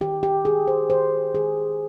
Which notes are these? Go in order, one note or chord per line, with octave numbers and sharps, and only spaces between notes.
D#3 G4
G4
D#3 G#4
C5
D#3 C5
D#3 G#4